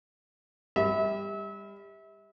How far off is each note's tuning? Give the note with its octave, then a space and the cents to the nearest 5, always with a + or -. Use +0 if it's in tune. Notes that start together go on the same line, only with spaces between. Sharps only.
G3 +25 E5 -35